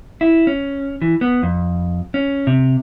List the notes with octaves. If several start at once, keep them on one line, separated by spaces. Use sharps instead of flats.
E4
C#4
E3
B3
F2
C#4
C3